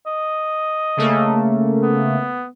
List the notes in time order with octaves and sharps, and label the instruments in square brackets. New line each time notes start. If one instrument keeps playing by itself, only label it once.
[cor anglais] D#5
[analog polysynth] C#3 A3 A#3
[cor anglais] B3